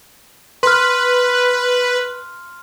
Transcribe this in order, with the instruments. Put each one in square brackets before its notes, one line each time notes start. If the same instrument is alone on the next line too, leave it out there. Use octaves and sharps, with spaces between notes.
[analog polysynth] B4 [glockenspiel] C6 F6